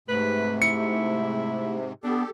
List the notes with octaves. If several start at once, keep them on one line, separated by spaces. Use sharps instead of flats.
G#2 C3 A3 B4
E4 C#7
B3 D4 G4 A4